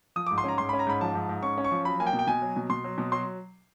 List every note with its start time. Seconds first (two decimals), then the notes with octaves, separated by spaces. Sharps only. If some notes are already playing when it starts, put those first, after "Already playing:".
0.16 F3 D#6
0.27 D6
0.31 G#2
0.38 C6
0.44 C#4 A#5
0.58 G#2 C6
0.69 C#4 B5
0.79 A#5
0.87 G#2 B5
1.01 F3 A5
1.15 G#2
1.29 G#2
1.43 C#4 C#6
1.57 C#4
1.64 C#6
1.71 F3
1.85 F#3 B5
2.00 A#3 G#5
2.07 G5
2.13 B2
2.19 G5
2.27 B2 G#5
2.42 F#3
2.56 B2
2.70 B2 C6
2.84 F#3
2.98 B2
3.12 F#3 C6